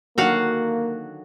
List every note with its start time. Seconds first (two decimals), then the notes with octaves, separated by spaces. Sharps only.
0.18 D3 D#3 F#3 A#3 F#4 F5 F#5